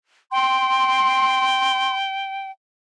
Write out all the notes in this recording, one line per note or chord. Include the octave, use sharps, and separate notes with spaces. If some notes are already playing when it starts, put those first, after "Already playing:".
G5 C6